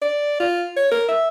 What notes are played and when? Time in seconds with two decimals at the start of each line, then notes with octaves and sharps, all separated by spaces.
0.02 D5
0.40 F4
0.76 C#5
0.91 A#4
1.08 E5